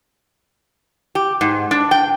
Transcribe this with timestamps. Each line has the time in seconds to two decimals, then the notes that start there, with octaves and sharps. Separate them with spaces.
1.15 G4
1.41 G#2
1.71 D4
1.91 G5